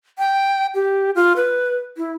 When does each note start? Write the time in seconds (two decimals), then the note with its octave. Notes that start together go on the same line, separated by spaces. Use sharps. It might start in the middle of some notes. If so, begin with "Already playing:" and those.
0.18 G5
0.75 G4
1.15 F4
1.36 B4
1.97 E4